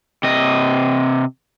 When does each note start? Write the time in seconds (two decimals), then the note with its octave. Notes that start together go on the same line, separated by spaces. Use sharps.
0.23 C3 D#5